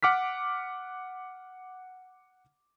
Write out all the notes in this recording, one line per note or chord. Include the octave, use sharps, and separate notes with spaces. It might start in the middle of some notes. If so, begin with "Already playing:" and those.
F#5 D6 F6 B6